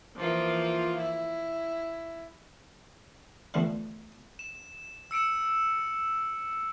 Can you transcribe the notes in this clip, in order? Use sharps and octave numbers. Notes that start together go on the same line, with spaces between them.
E3 F3 A#3 F4
E4
D3 E3 F3 A3 B3 C4
E7
E6 C#7 D7 E7